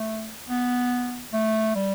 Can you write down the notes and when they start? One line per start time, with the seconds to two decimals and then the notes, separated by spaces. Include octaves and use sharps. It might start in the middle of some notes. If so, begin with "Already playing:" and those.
Already playing: A3
0.50 B3
1.33 A3
1.75 G3